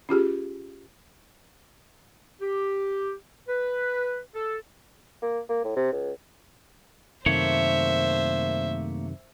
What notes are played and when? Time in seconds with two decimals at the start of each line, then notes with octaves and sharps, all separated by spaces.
0.09 C#4 F4 G4 G#4
2.41 G4
3.48 B4
4.35 A4
5.22 A#3
5.49 A#3
5.64 A2
5.76 C3
5.92 C#2
7.26 F#2 C3 D#3 A3 A#3 C5 C#5 E5